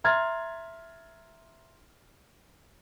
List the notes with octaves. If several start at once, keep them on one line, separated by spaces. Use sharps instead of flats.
E5 A#5 C6 F6 G#6 A6